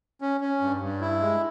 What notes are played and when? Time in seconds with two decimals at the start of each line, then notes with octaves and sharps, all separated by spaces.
0.21 C#4
0.41 C#4
0.61 G2
0.81 G2
1.01 E4
1.21 G#3